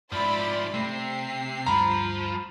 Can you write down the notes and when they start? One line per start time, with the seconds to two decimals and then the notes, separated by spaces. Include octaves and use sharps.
0.12 G#2 F3 E4 D5 B5 C6
0.74 C3 A3 C7
1.66 D2 G2 F3 A#5 B5